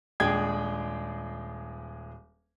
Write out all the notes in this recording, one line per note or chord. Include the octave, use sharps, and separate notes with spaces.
D#1 G#3 D4 G#4 G5 G#6